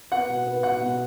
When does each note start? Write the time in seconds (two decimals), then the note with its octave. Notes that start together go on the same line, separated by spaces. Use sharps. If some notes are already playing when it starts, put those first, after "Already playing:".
0.12 B3 F#5
0.29 B2
0.47 B3
0.63 B2 F#5
0.81 B2